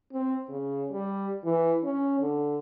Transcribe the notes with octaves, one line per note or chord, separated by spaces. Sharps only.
C4
C#3
G3
E3
C#4
D3